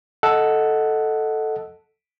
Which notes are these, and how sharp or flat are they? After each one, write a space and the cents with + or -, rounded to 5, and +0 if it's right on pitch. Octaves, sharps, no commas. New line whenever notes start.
A4 +0 D#5 +10 F#5 +0